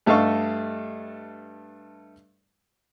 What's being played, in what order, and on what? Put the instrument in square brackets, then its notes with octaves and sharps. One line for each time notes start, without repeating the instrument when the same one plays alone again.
[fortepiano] G2 A3 A4 D#5 F5 C#6